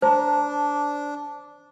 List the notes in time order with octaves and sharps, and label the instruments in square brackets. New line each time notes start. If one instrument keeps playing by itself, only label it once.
[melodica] D4 [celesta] C5 [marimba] A5 A#5